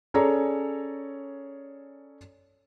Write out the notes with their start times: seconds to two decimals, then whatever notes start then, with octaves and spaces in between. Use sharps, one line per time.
0.14 C#4 G#4 A4 C#5 D5 A#5